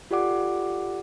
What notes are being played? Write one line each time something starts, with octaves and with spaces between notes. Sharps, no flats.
F4 G4 A4 D5 F#5 D6